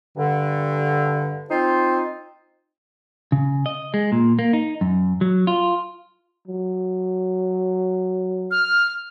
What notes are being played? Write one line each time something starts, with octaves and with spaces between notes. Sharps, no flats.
G2 D3
C4 D#4 F4 C5
C#3
D#5
G#3
A#2
A#3
D#4
F#2
F#3
F4
F#3
F6